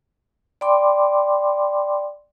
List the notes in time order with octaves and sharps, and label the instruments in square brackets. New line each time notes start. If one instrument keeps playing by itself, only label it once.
[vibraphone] D5 G5 B5 C6 D6